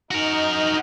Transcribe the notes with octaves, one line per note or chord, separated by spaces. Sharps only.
D#4 F#4 A#4